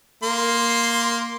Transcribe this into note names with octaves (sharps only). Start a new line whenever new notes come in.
A#3 C6